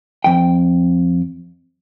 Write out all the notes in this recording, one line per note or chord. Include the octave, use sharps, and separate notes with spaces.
F2 G5